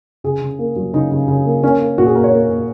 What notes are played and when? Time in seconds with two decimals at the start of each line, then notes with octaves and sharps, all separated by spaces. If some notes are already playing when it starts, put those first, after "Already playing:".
0.24 C#3 G#4
0.41 C#3
0.59 A#3
0.76 F#3
0.93 C#3 D#4
1.11 C#3
1.28 C#3
1.45 A#3
1.63 A#3 C#4
1.80 A#3
1.98 A#2 F#4
2.06 G#4
2.15 A#3 A#4
2.24 C#5
2.32 A#3
2.49 A#2